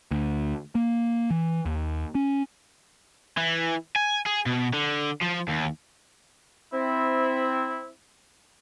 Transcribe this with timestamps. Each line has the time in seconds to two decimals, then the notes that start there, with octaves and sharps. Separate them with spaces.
0.11 D2
0.75 A#3
1.30 E3
1.65 D#2
2.15 C#4
3.38 E3
3.96 G#5
4.26 G#4
4.46 B2
4.73 D3
5.22 F3
5.49 D#2
6.73 C4 E4